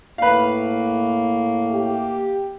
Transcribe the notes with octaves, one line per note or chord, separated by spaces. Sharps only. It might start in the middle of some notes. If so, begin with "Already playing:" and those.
A2 A#3 B4 F5
G4